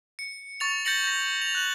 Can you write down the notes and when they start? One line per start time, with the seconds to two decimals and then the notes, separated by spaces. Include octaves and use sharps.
0.19 C#7
0.60 C#6 A6 F7
0.85 G6 A6 A#6 C#7 F#7
1.04 G6 A#6
1.42 F7
1.55 F#6 F#7